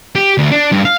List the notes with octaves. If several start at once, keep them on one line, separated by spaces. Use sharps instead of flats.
G4
D2
D4
G2
F5